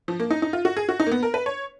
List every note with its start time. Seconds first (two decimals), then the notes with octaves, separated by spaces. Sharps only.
0.08 F3
0.20 A#3
0.31 D#4
0.42 D#4
0.53 F4
0.65 F#4
0.77 G#4
0.89 F#4
1.00 D#4
1.07 A#3
1.12 B3
1.23 A#4
1.34 B4
1.46 C#5